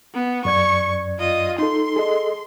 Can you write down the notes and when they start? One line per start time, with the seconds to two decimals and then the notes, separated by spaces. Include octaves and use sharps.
0.14 B3
0.45 F#2 D5 C#6 G#6
1.18 F4 D#5
1.59 D#4 A4 C6
1.96 G#4 A4 D#5